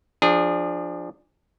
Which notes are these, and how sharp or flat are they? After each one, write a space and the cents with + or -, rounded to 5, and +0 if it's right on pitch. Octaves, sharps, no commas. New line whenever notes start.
F3 +0 D4 +15 G#4 -20